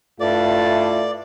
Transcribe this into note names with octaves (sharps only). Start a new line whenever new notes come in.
G2 A3 E4 F4 D5